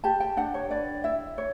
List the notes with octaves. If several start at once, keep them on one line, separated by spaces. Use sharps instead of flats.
G4 A5
G5
D4 F#5
C#5
B4 D5
E4 E5
C#5